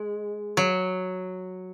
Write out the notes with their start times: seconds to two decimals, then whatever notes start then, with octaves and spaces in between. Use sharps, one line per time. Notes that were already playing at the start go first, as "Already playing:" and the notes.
Already playing: G#3
0.57 F#3